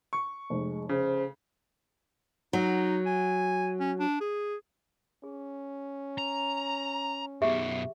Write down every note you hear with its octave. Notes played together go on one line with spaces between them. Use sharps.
C#6
F1 G#3
C#3 C5
F#3 D#4
G#5
C#4
D4
G#4
C#4 G#4
A#5
F#2 B2 G4 G#4 E5